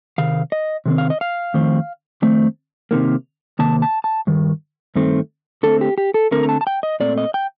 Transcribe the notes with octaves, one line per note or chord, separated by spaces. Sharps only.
C3 D#3 F5
D#5
C3 D#3 C4
F5
D#5
F5
F2 D#3 A3 C4
F2 D#3 A3 C4
C3 D#3 A#3
C3 D#3 A#3 A5
A5
A5
G2 D#3
G2 D#3 A3 C4
D3 A3 C4 A4
G4
G4
A4
D3 A3 C4 A#4
A#5
A5
A5
G5
D#5
A#2 A3 C4 D5
D#5
G5